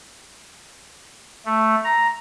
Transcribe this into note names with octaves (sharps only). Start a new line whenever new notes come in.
A3
A#5